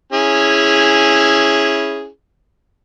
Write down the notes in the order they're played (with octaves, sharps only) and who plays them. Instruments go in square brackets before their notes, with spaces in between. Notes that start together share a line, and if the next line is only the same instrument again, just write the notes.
[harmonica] C#4 E4 G#4